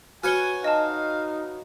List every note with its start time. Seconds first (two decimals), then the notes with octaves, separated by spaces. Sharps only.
0.23 F#4 B4 C#5 G#5 F6 C#7 G7
0.64 D#4 D#5 F5 A5